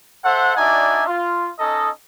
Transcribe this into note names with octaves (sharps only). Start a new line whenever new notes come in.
A4 C5 E5 F#5
D4 D#4 F#4 D5 E5 G#5
F4
C#4 D#4 A4 D#5